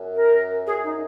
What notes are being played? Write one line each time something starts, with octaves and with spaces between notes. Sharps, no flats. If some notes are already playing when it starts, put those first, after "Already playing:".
Already playing: F#2
A#4
F#2 G#4
D#4